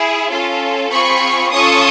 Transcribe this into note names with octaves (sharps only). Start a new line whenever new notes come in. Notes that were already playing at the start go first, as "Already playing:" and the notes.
Already playing: E4 G#4
C#4 F4 A4
C4 F4 G#4 B5 C#6
C#4 F4 A4 C#6 D#6